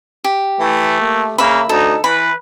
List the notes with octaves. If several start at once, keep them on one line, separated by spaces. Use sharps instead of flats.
G4
E3 A3
A#3
C#3 A#3 E5 B5
D2 D#4 A4
E3 B4 B5